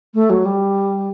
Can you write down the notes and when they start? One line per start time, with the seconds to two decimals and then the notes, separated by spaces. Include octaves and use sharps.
0.14 A3
0.30 F#3
0.45 G3